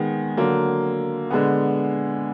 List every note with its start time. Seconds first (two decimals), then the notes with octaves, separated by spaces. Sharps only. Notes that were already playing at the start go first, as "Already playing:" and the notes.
Already playing: D#3 G#3 B3
0.37 D3 F#3 A#3
1.31 D3 G#3 B3